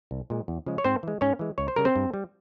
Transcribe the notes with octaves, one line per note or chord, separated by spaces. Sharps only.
C2
A#2 G#3
E2
C#3 F3 G#3
C#5
G#2 C4 C5
E3 G#3
G#2 C#4 C#5
E3 G#3
C#2 C#5
C5
C#3 G3 A#4
C4 C5
G2
G3